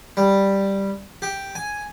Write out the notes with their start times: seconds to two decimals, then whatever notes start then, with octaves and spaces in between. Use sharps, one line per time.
0.17 G3
1.22 G4
1.55 G#5